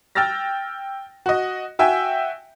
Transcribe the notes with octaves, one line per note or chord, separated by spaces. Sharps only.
G5 E6 F6 A6 A#6
F#4 D#5
F#4 E5 G5 G#5